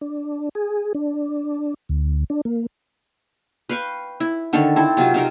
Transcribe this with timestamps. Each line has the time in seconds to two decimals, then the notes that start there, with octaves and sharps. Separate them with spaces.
0.01 D4
0.55 G#4
0.95 D4
1.89 D2
2.30 D4
2.45 A#3
3.69 B4 F5 G5 C#6
4.20 E4
4.53 D3 D#3 A4 C#5
4.76 C4 E4 A4
4.97 C3 F#3 F4
5.14 C3 D#4 A#4 A#5